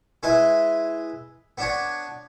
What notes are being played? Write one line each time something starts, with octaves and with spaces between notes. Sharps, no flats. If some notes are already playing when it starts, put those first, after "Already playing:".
G#3 E4 B4
B3 D4 C#5